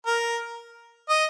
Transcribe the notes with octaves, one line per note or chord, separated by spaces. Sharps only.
A#4
D#5